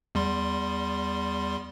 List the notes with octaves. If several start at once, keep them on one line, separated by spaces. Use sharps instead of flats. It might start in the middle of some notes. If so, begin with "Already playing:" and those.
E2 G3 C6